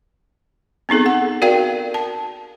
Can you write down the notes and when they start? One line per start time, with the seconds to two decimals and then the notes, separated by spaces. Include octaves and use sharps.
0.89 B3 C4 D#4 G#4 A4
1.06 F#5
1.42 F#4 A#4 D5 F5 G5
1.94 A5